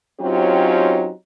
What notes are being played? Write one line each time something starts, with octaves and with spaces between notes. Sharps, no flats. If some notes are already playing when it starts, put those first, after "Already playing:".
F#3 C4 C#4 D#4 F4 G4